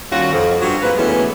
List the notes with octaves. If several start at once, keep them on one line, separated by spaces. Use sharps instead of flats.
D#2 G3 C#4 F4 F#4
F2
G2 F#3 F4 F#4
G#2 A#3 C4 B4
E3 F#3 G#3 A3 B3 C#4